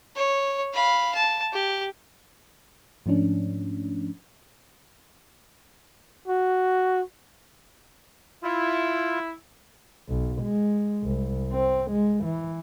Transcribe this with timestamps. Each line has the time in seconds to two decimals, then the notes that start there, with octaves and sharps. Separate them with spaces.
0.16 C#5
0.73 F5 B5
1.15 A5
1.53 G4
3.06 G#2 F3 A3 C#4 D4
6.28 F#4
8.43 E4 F4
10.09 B1
10.42 G#3
11.03 C2
11.53 C4
11.91 G#3
12.25 E3